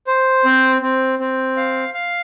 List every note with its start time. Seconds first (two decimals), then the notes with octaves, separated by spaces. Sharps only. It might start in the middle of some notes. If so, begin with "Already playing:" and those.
0.07 C5
0.45 C4
0.82 C4
1.19 C4
1.57 F5
1.94 F5